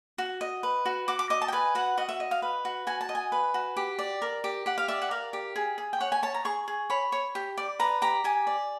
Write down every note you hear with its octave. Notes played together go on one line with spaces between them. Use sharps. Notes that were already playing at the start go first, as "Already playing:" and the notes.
F#4
D#5
B4
F#4
F#4 D6
D6
D#5 D6
A5
G5
B4 G#5
F#4 F#5
F#4 D#5
E5
D#5
F5
B4
F#4
F#4 G#5
A5
D#5
G#5
B4
F#4
G4
D5
A#4
G4
G4 F#5
F5
D5 E5
F#5
A#4 F5
G4
G#4
G#4
G5
C#5 F#5
G#5
C#5 A5
A#5
G#4 C#6
G#4
C#5 B5
C#5
G4
D5
B4 A#5
G4 A#5
G4 G#5
D5